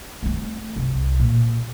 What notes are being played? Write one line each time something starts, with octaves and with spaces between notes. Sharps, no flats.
A3 C4
C2 C3
A#2